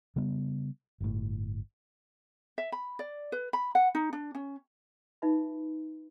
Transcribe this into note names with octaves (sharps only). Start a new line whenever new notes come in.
C#3 G3 B3
G1 A2
E5
B5
D5
B4
B5
F#5
D#4
D4
C#4
D#4 F4 B4 E5 B5